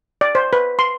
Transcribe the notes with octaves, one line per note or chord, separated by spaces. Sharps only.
D5
C5
B4
C6